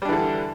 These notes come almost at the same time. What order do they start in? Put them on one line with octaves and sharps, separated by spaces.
G3 D4 E3 D3